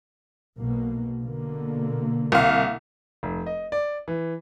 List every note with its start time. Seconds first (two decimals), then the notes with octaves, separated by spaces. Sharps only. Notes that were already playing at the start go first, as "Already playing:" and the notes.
0.58 B1 B2 A#3
1.20 B2 D3 A#3
2.32 C2 F5
3.23 F1
3.46 D#5
3.72 D5
4.08 E3